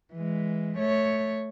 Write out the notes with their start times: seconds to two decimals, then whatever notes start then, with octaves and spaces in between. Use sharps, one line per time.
0.14 E3 G#3
0.78 A3 C#5